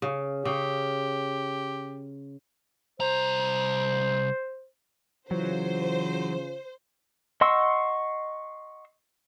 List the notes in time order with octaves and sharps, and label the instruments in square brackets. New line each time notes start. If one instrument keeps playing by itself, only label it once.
[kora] C#3
[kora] C#3 [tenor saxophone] G4
[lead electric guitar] C2 A#5 [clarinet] C5
[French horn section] C#3 F4 [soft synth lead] E3 [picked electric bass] F#3 [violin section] C5
[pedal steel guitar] D#5 F#5 C6 C#6 E6